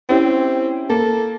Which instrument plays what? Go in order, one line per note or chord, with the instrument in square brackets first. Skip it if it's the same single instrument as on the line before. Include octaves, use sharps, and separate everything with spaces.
[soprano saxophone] C4 [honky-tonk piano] C#4 E4 G4
[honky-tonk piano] A#3 [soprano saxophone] A4